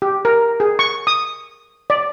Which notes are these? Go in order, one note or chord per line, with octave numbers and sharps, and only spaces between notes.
G4
A#4
G#4
C#6
D#6
D5